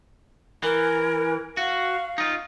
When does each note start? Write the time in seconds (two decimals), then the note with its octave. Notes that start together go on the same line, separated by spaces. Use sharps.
0.63 E3 A#4
1.57 F#4 F5
2.18 D#4 F4